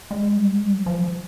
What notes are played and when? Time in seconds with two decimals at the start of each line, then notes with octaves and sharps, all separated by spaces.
0.11 G#3
0.36 G3
0.49 G#3
0.62 G3
0.74 F#3
0.86 F3